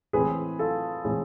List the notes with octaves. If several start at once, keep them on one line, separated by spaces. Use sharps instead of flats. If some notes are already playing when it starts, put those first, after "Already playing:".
A2 E3 G#3 C4 G#4 B4
F4 A4
A2 E3 G#3 C4 G#4